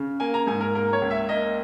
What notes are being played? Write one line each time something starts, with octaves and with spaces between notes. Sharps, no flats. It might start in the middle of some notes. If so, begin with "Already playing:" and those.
Already playing: C#3
A#3 G#5
A#5
G#2 G#5
A#4
A#3 A#4
C#5
C#2
E5
A#3 D#5